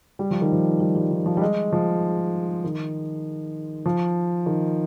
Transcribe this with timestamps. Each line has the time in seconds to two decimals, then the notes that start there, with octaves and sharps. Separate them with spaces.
0.19 G3
0.31 F3
0.41 D#3
0.52 F3
0.80 G3
0.95 G3
1.11 D#3
1.26 F3
1.37 G3
1.42 G#3
1.72 F3
2.64 D#3
3.86 F3
4.46 D#3